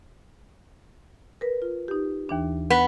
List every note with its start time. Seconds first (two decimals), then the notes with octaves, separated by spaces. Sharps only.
1.41 A#4 B4
1.62 F4
1.88 D#4 G4
2.29 D#2 E3 D4
2.70 B3 F#6